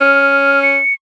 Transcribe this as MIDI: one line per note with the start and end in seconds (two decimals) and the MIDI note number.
0.01 0.78 61
0.01 0.60 89
0.62 0.94 97